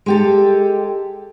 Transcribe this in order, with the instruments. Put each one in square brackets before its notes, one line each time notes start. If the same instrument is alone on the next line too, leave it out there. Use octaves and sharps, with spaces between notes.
[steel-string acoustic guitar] G#3 G4 A4